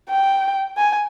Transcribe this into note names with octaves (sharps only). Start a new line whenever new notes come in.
G5
G#5